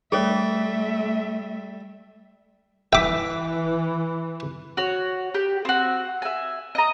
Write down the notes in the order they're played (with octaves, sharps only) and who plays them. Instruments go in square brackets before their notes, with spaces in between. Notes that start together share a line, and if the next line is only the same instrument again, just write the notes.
[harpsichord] G3 [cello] A3 E5 [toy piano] G#4 A4 C#5
[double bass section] E3 [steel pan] E5 [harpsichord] G5 D6
[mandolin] F#4 C#5
G4
C4 F#4
E5 G#5
D#5 A#5